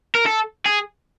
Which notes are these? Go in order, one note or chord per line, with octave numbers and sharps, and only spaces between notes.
A#4
A4
G#4